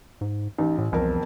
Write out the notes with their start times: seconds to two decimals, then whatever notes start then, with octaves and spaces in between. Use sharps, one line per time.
0.21 G#2
0.58 A1 D#4
0.78 A2
0.92 E1 C2 F2 A#4